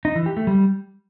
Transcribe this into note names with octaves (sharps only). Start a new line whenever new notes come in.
D#4
E3
G4
A3
G3